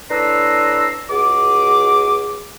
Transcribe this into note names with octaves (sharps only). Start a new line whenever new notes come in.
A2 D4 B4 A#5 C6 E6
C#2 F#4 G#4 D6